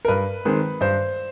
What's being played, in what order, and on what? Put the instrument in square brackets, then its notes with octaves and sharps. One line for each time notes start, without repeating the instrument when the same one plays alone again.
[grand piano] A#4
G2 B4
D#3 G#3 C4
G2 C5